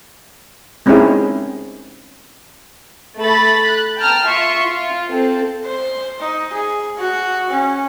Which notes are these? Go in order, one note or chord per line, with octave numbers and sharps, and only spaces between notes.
G#3 C4 C#4 D#4 E4 G#4
A3 A4 B5 A6
F#6
G5 A5 A#5 F6
F4 E5 C6 C#6
F4
C4 A4
C5
D#4
G#4
F#4
C#4